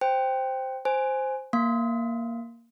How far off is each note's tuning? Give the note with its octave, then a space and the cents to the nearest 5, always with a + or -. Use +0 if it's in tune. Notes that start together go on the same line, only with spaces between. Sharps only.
C5 +0 G5 +0
C5 +0 G#5 +0
A#3 +0 F5 +0